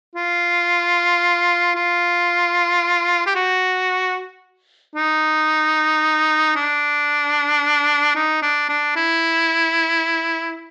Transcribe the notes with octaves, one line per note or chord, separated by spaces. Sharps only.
F4
F4
G4
F#4
D#4
D4
D#4
D4
D4
E4